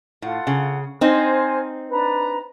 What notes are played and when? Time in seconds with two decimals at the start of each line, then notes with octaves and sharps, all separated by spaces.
0.22 A2 F4 A4 F#5
0.47 C#3
1.01 C4 D#4 C5 G#5 F6
1.90 D4 B4 A#5